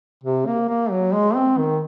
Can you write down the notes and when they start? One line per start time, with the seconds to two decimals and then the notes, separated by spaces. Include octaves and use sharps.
0.24 C3
0.47 A#3
0.69 A#3
0.91 F#3
1.13 G#3
1.35 C4
1.58 D#3